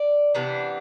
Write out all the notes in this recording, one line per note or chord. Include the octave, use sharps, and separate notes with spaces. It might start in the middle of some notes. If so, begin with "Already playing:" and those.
Already playing: D5
C3 E3 B3 D4